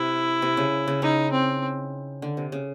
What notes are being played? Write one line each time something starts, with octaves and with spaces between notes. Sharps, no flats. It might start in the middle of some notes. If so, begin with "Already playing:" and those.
Already playing: C3 E4
C3
C#3
C#3
C#3 D#4
C4
D3
C3
C#3